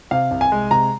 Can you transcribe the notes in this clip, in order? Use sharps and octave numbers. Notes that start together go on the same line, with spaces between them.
C3 F5
C2
G#5
G#3
C3 A#5